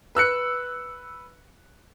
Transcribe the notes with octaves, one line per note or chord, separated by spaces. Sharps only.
B4 E6 F#6 C#7